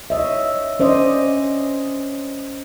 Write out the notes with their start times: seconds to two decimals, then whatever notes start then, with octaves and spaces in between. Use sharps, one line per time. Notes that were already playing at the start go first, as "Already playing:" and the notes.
0.10 C#5 D#5 E5
0.80 C#4 C5 D5 D#5